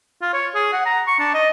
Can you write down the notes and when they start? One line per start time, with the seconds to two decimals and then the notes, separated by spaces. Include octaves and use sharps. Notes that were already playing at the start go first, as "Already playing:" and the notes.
0.22 F4
0.33 C#5
0.55 G#4
0.73 F#5
0.85 A#5
1.07 C#6
1.19 D4
1.34 D#5